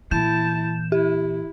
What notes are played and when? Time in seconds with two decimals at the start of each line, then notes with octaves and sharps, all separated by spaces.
0.11 A#2 E3 E4 A5 G6 E7
0.92 E4 G4